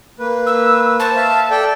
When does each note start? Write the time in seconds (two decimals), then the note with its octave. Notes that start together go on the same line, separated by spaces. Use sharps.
0.19 A#3 B4
0.47 E6
1.00 C5 A5 C#6
1.16 E5 F5
1.51 A4 D5 G5